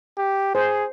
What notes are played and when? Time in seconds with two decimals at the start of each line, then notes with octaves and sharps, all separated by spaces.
0.17 G4
0.55 G#4 C5